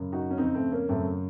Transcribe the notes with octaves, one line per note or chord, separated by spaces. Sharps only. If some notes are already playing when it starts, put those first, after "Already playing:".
Already playing: F#2 C#3
D#4 F#4
C#4
F2 C#3 C4 D#4
A3 C4
A#3 C#4
F#2 C#3 A3 C4